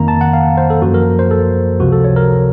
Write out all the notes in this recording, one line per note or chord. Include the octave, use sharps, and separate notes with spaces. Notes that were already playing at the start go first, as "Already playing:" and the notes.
Already playing: F2 D#3 A#3 A#5
A5
F#5
F5
C5
A4
F#2 F3 A#3 F#4
A#4
C5
A4
C#2 C3 F3 F#4
A4
C#5
A#4